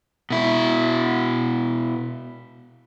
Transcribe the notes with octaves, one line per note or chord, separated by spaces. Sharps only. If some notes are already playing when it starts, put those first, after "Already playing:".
B2 E4